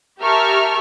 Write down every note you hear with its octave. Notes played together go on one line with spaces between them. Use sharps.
G4 A#4 E5 A5 C#6 F6